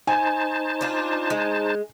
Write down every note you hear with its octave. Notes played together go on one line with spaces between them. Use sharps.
D#4 C5 G#5 A5
D4 F4
G#3